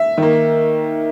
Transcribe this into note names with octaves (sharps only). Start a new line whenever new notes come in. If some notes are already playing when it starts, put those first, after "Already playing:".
Already playing: E5
D#3 A#3